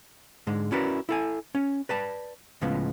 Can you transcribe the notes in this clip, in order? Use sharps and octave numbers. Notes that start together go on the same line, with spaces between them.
G#2 D3 G#3
C#4 E4 F#4 A#4 B4 D5
E4 A4 G#5
C#4
B4 D5 A5
C#2 A2 C#3 F3 G#3 B3